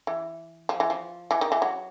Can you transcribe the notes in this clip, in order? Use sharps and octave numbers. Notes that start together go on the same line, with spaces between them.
E3
F3
E3
F3
E3
D#3
E3
F#3